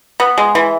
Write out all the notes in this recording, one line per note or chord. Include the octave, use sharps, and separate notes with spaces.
B3
G#3
E3